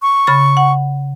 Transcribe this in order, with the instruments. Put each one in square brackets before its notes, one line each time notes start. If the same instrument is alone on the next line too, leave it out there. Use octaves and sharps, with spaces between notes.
[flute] C#6
[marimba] C#3 B5 A6
F#5